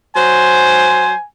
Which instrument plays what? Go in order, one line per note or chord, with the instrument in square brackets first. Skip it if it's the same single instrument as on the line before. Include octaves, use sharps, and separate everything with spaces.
[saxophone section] F#3 C5 [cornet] G#5